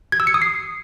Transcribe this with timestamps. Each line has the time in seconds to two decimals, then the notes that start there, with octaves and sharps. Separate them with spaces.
0.12 G#6
0.20 E6
0.27 C#7
0.34 D#6
0.42 C7